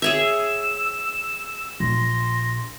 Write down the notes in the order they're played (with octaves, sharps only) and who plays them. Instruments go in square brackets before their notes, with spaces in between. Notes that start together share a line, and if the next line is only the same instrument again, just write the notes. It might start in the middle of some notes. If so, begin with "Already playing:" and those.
[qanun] G#4 C#5 E5 [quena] E6 [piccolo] E7
[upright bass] A#1 [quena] C6 [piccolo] A#6